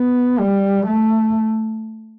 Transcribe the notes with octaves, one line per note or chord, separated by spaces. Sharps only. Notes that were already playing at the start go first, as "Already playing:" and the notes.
Already playing: B3
G3
A3